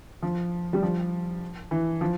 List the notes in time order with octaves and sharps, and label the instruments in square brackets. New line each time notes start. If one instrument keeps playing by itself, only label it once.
[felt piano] F3
G3
F3
E3
F3